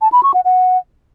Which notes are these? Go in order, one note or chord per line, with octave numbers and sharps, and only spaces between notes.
A5
B5
C#6
F#5
F#5